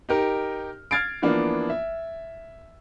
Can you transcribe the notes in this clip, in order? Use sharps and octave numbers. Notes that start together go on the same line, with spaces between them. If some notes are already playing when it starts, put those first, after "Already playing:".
D#4 G4 A#4
F6 G#6 A6 C7 D7
E3 F3 A#3 B3 D4
E5